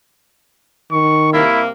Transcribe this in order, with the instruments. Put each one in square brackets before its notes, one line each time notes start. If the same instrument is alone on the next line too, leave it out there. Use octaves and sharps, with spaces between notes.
[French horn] D#3 [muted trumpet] C#6
[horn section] C3 G3 A#3 [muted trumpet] E4